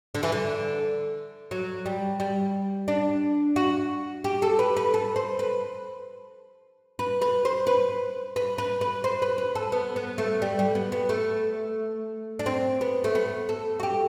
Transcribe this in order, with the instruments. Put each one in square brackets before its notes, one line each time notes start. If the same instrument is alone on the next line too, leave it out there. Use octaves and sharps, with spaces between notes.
[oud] D3
E3
D3
F#3
G3
G3
D4
F#4
G4
A4
B4
B4
A4
C5
B4
B4
B4
C5
B4
B4
B4
B4
C5
B4
B4
A4
B3
B3
A3
G3
G3
B3
B3
A3
D4
C4
B3
A3
B3
A4
F#4
G4